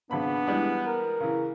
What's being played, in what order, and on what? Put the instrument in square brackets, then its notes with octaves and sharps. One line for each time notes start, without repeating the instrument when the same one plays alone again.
[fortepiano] G#1 C#3 B5 [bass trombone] B3 [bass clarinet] D4
[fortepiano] E3 G3 G#3
[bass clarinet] A#4
[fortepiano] C#3 E3